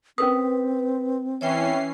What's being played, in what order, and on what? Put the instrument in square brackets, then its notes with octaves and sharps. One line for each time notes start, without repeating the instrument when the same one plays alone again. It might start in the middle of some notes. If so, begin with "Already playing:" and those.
[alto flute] C4 [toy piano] C#4 A#4 D#6 [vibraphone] B4
[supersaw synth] E3 C#4 C7 [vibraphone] C#5 E5 G5